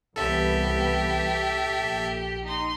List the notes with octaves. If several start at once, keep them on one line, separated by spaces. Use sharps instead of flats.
C2 E3 B3 G4 A4 E5
A#1
D#4 C6